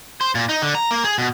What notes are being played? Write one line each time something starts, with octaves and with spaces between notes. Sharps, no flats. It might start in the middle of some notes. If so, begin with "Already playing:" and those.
C5
A#2
D#4
D3
A#5
A#3
G#4
B2